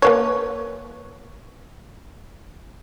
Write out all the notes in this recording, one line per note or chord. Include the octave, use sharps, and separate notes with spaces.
A#3 B4 C#5